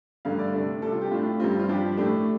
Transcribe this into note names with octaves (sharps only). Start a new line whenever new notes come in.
G2 D3 A3 F5
D5
C3 A3 D4
C3 G3 D4 A4
F4
G4
A2 A3 D4 F4
G4
G2 G3 C4 F4
F4
G2 F3 D4 G4
A2 A3 D4 G4